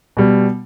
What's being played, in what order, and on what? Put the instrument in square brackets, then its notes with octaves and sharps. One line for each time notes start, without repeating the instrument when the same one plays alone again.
[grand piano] B2 G3